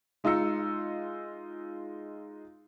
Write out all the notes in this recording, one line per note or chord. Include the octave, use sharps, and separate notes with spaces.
G#3 D#4 F4 A#5 E6 C#7